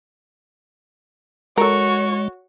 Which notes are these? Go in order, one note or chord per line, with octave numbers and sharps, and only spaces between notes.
G#3 F#4 A4 A#4 C#5 C#6